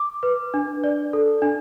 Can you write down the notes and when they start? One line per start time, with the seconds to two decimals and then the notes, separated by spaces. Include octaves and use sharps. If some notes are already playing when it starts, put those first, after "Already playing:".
Already playing: D6
0.23 B4
0.54 D4
0.84 D5
1.13 A4
1.42 D4